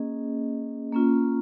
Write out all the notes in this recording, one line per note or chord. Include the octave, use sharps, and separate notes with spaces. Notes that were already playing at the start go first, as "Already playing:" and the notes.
Already playing: A#3 C#4 G#4 D#5
A#3 C#4 F4